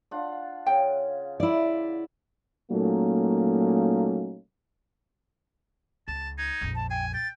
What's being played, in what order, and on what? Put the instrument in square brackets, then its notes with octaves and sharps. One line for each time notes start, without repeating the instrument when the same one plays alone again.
[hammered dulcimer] D4 F4 F#5
[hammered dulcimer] C#3 [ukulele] G5
[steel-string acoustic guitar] E4 D5
[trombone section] A#2 F#3 A3 A#3 C#4 D#4
[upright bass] C#2 [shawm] A5
[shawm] D#4 [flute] G#6
[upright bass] A#1 F2
[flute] A5
[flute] G5 [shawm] G#5
[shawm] G5 [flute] A6